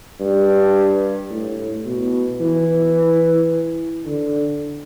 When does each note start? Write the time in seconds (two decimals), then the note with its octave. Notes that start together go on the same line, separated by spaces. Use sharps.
0.20 G2
1.30 A2
1.86 B2
2.40 E3
4.05 D3